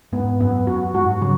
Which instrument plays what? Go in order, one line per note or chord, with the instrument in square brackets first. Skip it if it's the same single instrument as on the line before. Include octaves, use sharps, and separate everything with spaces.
[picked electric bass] G#2 [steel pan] B3
[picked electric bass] F#2 [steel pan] B3
[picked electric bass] F#2 [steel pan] F#4
[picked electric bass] G#2 [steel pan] F#4
[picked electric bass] C#3 [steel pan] F#3